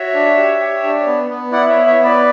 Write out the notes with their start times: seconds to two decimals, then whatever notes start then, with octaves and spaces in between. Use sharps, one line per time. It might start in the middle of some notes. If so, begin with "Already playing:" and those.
Already playing: F#4 C#5 E5
0.14 D4
0.38 G4
0.61 G4
0.83 D4
1.06 B3
1.30 B3
1.52 E4 D5 F#5
1.69 C#5 E5
1.75 B3
1.86 C#5 E5
1.99 B3
2.04 B4 D5